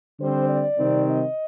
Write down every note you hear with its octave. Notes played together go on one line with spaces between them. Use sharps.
D3 G3 C4 C5
D5
C3 D#3 G3 C4 D#4
D#5